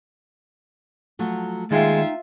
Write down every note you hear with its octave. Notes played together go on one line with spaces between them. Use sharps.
F3 F#3 A3
D#2 G#3 D#4 F4 E5 G5